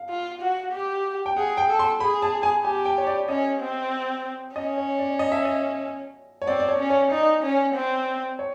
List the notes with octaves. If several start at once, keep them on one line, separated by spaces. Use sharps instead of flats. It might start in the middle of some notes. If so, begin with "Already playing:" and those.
Already playing: F5
F4
F#4
G4
G5
G#4 F#5
G5
A4
C6
G#4 B5
A5
G#5
G4 G#5
G5
C#5
D5
C#4 D#5
C4
C#4 D#5
C#5
D5
D#5
E5
D#5
C#5
C4 D5
D5
C#5
C#4
C#5
D#4 D5
C#4
C4
C#5